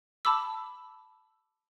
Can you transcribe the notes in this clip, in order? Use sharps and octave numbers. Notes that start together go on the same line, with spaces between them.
A5 B5 D6 E6